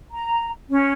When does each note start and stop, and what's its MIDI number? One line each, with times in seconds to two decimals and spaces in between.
0.13 0.50 82
0.70 0.93 61